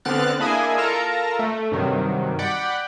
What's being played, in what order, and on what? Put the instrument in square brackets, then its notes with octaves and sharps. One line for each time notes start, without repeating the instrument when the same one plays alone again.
[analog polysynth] D3 B3 C4 F6 F#6 A6
A#3 D4 E4 G#4 D#5 G#5
F4 A4 A#4 A5 A#5
A3
G2 C3 D#3 F#3
D5 F#5 G5 B5